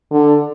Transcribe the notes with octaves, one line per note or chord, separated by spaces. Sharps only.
D3